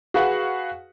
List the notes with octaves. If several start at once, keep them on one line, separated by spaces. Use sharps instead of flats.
F#4 G#4 B4 F5 F#5